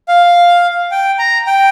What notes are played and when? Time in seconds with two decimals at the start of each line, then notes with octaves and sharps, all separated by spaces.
0.08 F5
0.91 G5
1.19 A#5
1.47 G5